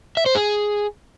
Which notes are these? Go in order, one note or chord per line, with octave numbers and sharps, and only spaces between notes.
E5
C5
G#4